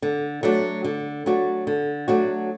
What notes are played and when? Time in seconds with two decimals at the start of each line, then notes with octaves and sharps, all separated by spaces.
0.02 D3
0.43 F#3 A3 D4 F#4
0.84 D3
1.26 F#3 A3 D4 F#4
1.67 D3
2.08 F#3 A3 D4 F#4